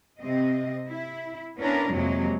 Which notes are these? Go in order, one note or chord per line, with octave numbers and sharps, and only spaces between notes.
C3 C4 D#5
E4
B3 C#4 D4 E4 A#4
F2 C3 F#3 G#3 A#3